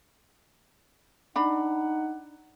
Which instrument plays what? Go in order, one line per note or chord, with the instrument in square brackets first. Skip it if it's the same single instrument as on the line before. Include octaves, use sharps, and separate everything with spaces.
[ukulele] D4 B5 [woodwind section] D#4 F#5